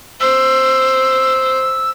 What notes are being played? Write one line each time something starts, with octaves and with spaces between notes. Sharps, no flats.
C5 E6